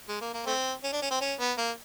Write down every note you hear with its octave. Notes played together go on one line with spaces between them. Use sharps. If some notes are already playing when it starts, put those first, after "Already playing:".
G#3
A#3
A#3
A3 C4
C#4
D4
C#4
C4
C#4
B3
A#3